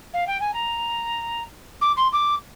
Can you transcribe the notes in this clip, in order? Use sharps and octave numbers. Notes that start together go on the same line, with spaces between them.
F5
G5
G#5
A#5
D6
C6
D6